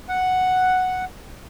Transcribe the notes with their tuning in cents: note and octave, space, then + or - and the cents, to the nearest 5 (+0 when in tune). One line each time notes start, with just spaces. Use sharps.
F#5 +0